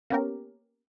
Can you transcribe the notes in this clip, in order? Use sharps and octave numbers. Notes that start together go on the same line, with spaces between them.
A#3 B3 C#4 G4 A#4